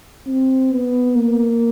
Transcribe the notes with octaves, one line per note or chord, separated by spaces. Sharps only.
C4
B3
A#3